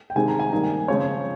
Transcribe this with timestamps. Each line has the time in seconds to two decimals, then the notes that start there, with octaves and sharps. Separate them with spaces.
0.10 G5
0.16 C3 D#3 G#3 C4 G#5
0.28 A#5
0.39 G#5
0.52 D#3 G3 A#3
0.88 C#3 F3 G#3 C4 C#5